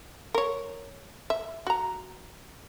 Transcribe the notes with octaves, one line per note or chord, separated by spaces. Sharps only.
A#4 C#5
E5
F#4 A#5